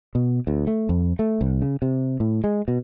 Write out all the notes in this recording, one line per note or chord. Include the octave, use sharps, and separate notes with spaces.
B2
D2
A3
F2
A3
C2
C#3
C3
A2
G#3
B2